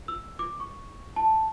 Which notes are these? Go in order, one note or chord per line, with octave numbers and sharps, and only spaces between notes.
E6
D6
C#6
A5